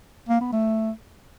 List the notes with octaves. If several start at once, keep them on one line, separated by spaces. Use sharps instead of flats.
A#3
B3
A3